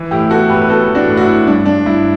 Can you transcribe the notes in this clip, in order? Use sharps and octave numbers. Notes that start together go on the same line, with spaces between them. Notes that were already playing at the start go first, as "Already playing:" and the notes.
Already playing: E3
A2 E4 G4
B3 F#4 A4
A2 G4 B4
B4
B3 F#4 A4
E3
D4 F#4
A2
F#4
E4
A2
G2 D4
G2 D4
G2 E4